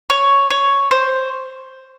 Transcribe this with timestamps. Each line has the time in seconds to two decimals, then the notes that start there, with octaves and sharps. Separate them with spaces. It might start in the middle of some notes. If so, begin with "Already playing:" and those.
0.10 C#5
0.50 C#5
0.91 C5